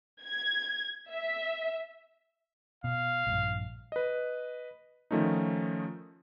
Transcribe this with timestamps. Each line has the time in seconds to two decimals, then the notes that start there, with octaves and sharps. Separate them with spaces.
0.22 G#6
1.11 E5
2.84 B2 F5
3.27 A#1 G2
3.92 B4 D#5
5.11 D#3 F3 A3 C#4 D#4